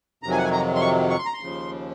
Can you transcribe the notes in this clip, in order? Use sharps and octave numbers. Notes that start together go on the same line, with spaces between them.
F2 C3 D#3 F#3 A#5
G#5
F#5
G#5
A#5
C6
C#6
C#6
C6
A#5
C6
D#2 C#3 F3